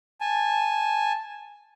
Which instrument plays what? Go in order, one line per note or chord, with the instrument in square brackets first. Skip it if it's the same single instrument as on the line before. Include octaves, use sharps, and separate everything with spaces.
[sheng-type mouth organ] G#5 A5